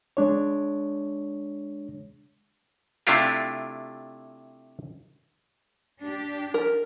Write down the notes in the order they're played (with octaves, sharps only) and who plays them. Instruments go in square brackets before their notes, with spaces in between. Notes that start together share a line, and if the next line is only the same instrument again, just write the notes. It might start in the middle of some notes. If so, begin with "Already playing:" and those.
[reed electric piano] G#3 D4 C#5
[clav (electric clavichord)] C3 A3 D4 E4 F4 G4
[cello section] D4 G4
[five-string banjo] A#4